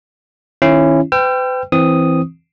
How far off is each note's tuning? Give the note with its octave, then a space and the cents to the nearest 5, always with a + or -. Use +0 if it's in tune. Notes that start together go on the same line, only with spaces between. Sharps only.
D#3 +0 C#4 -20 E4 +20
B4 +45 G5 +0 E6 +45
E3 -5 C4 +0 D#6 +0